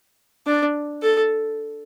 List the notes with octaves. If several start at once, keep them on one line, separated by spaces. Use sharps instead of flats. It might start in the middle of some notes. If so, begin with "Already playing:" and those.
D4
A4